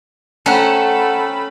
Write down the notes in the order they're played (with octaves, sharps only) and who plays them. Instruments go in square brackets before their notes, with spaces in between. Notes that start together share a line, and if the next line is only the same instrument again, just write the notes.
[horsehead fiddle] A3 B5 [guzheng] C#4 [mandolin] A4 F#5 [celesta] C5 G5 A#5